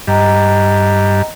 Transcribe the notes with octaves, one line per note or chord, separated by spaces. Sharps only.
G2 D#5 G5 A#5